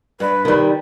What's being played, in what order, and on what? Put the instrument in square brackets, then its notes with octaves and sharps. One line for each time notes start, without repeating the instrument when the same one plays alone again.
[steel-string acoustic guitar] G2 [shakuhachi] B4
[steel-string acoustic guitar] D#3 G3